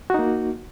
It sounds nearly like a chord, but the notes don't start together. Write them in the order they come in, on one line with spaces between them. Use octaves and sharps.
F#4 D#4 A#3